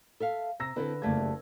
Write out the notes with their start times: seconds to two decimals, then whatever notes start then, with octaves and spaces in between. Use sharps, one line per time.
0.20 A4 E5 F5
0.60 C3 A#5 E6 A#6
0.76 D3 C4 E4 A4 B4
1.02 F#1 D#2 G3 A3 D5 G#6